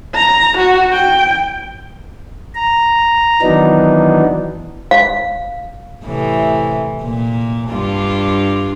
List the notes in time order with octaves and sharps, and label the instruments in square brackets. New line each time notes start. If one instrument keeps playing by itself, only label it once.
[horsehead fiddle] A#5
F#4
G5
[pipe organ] A#5
D#3 E3 F#3 B3 D4 D#4
[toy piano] F5
[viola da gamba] A2 C3 E3
A#2
G2 D4 F4